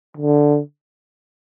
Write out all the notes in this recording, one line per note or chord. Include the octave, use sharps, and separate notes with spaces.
D3